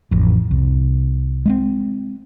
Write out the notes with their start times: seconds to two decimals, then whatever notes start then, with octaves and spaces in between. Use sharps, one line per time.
0.11 A1 F2
0.51 C2
1.46 G#3 B3 C4